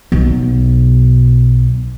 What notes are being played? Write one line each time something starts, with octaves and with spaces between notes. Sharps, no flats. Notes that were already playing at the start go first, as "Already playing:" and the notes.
B1 B2